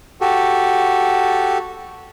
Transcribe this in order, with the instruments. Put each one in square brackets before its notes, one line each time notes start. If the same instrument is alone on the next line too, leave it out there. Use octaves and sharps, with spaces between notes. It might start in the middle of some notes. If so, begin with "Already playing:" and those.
[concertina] F#4 G4 A4